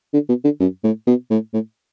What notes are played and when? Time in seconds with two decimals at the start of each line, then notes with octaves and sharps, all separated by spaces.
0.13 D3
0.29 B2
0.44 D3
0.60 F#2
0.84 A2
1.07 B2
1.30 A2
1.53 A2